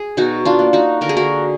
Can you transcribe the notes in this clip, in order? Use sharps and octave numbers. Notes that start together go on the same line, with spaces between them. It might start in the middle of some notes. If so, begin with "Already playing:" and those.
Already playing: G#4
B2 D#4 F#4
D4 F4
A#3
D#4 F#4
D3 A#4
G#4
F#4 A#4